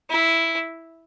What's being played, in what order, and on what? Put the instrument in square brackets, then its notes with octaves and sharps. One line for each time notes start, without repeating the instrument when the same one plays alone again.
[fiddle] E4